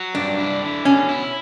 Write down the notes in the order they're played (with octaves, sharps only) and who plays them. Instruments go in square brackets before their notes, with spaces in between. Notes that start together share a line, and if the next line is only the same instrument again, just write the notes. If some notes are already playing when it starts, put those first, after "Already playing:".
Already playing: [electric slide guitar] F#3
[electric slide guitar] G2 [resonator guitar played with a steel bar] D4
[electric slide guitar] E4
D3
[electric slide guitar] B2 [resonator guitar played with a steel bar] C#4
[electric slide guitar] E4